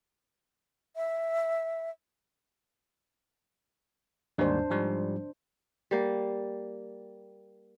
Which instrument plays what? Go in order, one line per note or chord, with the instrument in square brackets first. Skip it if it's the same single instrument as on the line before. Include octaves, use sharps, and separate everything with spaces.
[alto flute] E5
[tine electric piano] D#2 G#2 G3 [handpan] D4 C5
[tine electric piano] G#2 F3 G3
[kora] G3 A#3